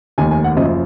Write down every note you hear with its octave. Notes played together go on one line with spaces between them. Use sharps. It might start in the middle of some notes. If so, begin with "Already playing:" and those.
F1 D#2 D#3 G#5
G#5
F#5
F#1 F#2 F3 D#5